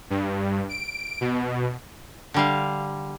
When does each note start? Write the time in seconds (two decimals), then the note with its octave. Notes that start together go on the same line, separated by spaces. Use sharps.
0.10 G2
0.69 D7
1.21 B2
2.34 D3 G3 F5